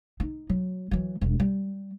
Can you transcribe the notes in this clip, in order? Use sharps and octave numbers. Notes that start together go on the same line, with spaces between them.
D#4
F#3
E3 F#3
E1 G2
G3